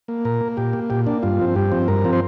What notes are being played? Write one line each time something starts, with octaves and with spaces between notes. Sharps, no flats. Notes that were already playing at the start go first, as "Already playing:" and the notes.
A#3
A#2 A#4
A#3
A#2 G4
A#3
A#2 G4
A#3 D4
G2 F4
F3 C4
G2 G4
F3 C4
G2 A#4
F3 C4
C5